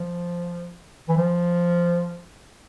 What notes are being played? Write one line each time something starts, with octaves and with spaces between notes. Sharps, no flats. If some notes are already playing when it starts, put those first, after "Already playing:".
Already playing: F3
E3
F3